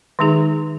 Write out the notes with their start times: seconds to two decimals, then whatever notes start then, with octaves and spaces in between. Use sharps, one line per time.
0.19 D#3 G#3 D#4 G#4